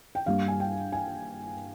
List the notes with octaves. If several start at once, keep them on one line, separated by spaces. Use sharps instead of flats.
G5
G2 G3 A#3 F5
G#5
G5
G#5